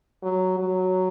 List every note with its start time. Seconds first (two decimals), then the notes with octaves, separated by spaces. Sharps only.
0.22 F#3
0.58 F#3